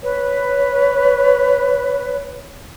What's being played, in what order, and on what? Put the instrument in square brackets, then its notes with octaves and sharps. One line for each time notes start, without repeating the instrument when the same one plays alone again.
[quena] B4 [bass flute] C#5